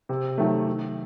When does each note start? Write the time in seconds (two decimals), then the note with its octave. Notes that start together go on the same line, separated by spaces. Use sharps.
0.09 C3
0.38 D#3 F#3 A3
0.67 D#3